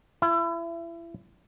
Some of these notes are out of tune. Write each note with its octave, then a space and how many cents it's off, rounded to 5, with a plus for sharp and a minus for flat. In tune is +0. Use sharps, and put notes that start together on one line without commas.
E4 +30